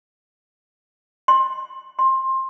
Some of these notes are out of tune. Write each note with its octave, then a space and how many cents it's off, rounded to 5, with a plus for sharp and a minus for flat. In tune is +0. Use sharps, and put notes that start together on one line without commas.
C6 +30
C6 +20